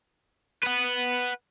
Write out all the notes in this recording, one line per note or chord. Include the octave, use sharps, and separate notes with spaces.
B4 F#5